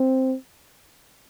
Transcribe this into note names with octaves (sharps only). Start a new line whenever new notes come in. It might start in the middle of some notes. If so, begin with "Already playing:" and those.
Already playing: C4